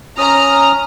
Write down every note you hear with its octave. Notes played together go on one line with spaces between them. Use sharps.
C#4 A#5 D#6 F6